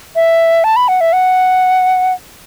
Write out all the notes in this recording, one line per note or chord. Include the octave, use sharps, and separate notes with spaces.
E5
A5
B5
F#5
E5
F#5